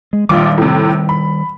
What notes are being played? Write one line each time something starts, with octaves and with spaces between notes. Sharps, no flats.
G#3
A#1 D#3 G3 F4 D6
A2 C3
B5